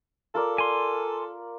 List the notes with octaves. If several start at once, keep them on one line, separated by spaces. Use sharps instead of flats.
F4 A4 A#4 D5
G#5 C6